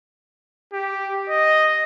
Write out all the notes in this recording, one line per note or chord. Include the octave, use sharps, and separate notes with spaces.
G4
D#5